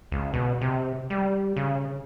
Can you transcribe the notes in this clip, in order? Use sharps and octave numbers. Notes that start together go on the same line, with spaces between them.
C#2
B2
C3
G3
C#3